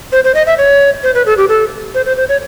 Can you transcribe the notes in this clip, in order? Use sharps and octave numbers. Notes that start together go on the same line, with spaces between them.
C5
C5
D#5
E5
C#5
C5
B4
A4
G4
A4
C5
C5
C5
C#5